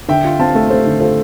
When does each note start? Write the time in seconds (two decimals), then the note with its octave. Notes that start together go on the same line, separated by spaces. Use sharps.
0.09 D3 E5 G5
0.24 F4
0.40 C4 F5 A5
0.55 A3
0.70 A3 A4 C5
0.86 D3
1.01 F4 A4 C5